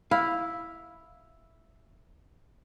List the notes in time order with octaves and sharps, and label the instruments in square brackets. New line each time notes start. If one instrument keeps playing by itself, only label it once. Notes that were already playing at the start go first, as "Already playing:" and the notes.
[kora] E4 [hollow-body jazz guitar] F5